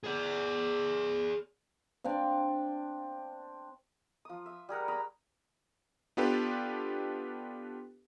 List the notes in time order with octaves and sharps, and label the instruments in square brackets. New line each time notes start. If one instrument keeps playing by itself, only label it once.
[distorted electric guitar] G#4 D5
[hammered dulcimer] C4 D4 D5 F5
[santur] F3 D#6
E5
G3 G#4 A#4 F#5
C#5 A#5 B5 D#6
[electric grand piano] B3 D4 F4 G4 A4 B4